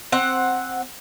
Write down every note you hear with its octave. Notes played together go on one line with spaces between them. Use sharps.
C4 F#5